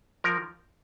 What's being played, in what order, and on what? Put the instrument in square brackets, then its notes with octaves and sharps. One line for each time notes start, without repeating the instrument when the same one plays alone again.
[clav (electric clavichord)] F3 A#4